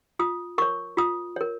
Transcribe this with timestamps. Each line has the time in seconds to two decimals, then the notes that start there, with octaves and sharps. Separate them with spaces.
0.19 F4 D#6
0.58 A#4 C#5 C#6
0.97 F4 D#6
1.36 A#4 C#5